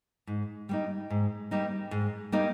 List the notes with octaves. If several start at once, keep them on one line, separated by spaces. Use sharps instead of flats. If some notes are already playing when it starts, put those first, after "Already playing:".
G#2
G3 A#3 D#4
G#2
G3 A#3 D#4
G#2
G3 A#3 D#4